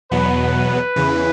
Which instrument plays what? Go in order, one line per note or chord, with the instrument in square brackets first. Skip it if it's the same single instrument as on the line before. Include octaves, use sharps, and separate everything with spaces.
[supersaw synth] E2 B2 F#3 B3 [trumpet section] B4
[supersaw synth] E2 C#3 E3